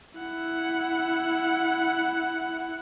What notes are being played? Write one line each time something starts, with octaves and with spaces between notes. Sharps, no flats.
E4 F#5